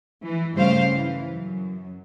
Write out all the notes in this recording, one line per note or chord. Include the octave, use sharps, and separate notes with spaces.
E3
G2 C#3 G3 A3 C5 F5
E3
F#2